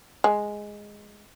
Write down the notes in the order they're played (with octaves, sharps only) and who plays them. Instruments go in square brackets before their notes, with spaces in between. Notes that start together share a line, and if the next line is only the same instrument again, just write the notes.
[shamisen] G#3